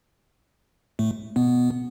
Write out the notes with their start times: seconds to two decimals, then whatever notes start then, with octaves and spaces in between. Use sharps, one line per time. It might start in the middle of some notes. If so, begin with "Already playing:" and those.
0.99 A2 A3
1.36 B2 B3